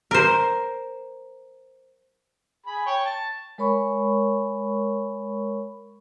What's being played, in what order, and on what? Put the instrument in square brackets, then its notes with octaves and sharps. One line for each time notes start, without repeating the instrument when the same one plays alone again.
[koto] A#4 C5
[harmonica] G#4 B5
C#5 G5
A5
[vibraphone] G#3 A#4 C#5 B5 C#6